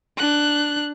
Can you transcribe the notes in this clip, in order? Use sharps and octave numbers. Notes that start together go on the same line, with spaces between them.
D4 F#6